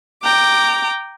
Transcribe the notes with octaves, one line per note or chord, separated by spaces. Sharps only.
G5 A#5 D6